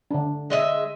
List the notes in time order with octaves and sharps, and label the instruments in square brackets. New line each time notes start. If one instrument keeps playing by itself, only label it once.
[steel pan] D3 D4
[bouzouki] G#3 D#5 E5